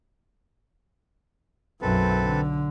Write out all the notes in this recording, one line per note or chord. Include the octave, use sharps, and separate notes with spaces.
B1 F#2 C4 A4 B4
D3